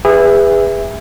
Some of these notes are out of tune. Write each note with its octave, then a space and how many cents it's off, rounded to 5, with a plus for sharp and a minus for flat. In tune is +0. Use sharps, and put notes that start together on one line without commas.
G#4 -30 B4 +0 E5 +0